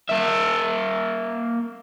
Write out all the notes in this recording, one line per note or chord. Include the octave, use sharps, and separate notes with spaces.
A#3 E5